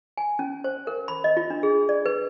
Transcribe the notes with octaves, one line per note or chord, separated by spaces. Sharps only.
G#5
C#4
C5
A#4
B5
D#5
F4
D4
G#4
D5
B4